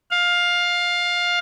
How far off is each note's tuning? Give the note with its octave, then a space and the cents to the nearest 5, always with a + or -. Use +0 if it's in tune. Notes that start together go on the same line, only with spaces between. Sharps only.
F5 +15